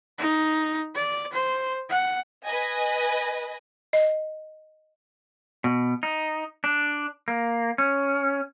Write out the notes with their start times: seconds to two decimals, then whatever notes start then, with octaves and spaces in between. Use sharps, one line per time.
0.18 D#4
0.95 D5
1.32 C5
1.89 F#5
2.44 B4 D#5 G#5
3.93 D#5
5.64 B2
6.03 D#4
6.64 D4
7.28 A#3
7.78 C#4